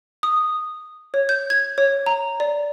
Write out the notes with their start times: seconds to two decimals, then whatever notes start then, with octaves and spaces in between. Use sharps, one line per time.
0.23 D#6
1.14 C#5
1.29 G6
1.50 G#6
1.78 C#5
2.06 A#5
2.40 D5